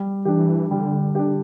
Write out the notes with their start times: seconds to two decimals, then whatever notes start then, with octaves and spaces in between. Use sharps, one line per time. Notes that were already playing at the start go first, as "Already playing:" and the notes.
Already playing: G3
0.25 E3 D4 G4
0.71 D3 G3
1.15 D4 G4